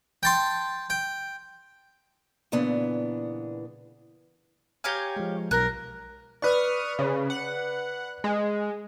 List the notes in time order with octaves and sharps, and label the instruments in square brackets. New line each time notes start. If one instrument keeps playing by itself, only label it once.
[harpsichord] G5 A5 C6
G5
[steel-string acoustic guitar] A#2 C#3 E3 B3 D4
[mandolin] G4 C#5 F5 [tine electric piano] G#5 A#5 G6
[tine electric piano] F3 G#3
[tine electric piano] B1 [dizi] A#4 [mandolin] F#6
[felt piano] B4 D5 [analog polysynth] C#6 D#6 F6
[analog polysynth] C#3
F#5
G#3